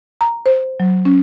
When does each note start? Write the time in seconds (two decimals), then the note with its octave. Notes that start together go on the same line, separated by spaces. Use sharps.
0.21 A#5
0.46 C5
0.80 F#3
1.05 C#4